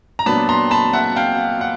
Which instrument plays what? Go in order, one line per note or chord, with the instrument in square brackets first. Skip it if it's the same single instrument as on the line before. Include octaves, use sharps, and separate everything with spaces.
[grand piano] A#5
A#2 F#3 B3 D4 A5 B5
A#5 C6
A5 B5
E5 F#5
F5 G5
F#5